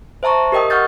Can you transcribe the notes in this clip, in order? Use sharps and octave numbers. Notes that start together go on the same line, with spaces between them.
C5 E5 A5 A#5 C#6
G4 A#4 D#5 G5 D#6
F#5 C#6 F6 G6 A6